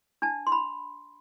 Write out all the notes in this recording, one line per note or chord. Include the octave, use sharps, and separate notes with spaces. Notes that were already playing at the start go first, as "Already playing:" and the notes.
D4 A5
C6
B5